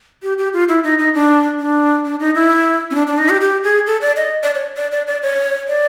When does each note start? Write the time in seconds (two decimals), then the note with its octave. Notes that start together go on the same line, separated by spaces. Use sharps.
0.23 G4
0.38 G4
0.53 F4
0.69 E4
0.84 D#4
0.99 D#4
1.14 D4
1.59 D4
2.05 D4
2.20 D#4
2.35 E4
2.91 C#4
2.95 D4
3.07 D4
3.18 D#4
3.29 G4
3.41 G4
3.64 G#4
3.87 A4
4.01 D5
4.16 D#5
4.43 D5
4.55 C#5
4.77 D5
4.92 D5
5.07 D5
5.23 C#5
5.68 D5